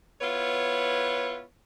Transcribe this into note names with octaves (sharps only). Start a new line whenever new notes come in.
B3 E4 F4 B4 C#5